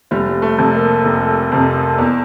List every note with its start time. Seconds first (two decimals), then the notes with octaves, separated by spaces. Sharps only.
0.11 F1 G3
0.29 G3
0.42 A3
0.58 F2 C3
0.75 A#3
1.05 F1
1.52 F2 C3
1.98 E2